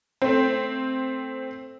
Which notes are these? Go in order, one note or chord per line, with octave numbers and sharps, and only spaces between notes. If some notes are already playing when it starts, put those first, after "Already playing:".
A3 C4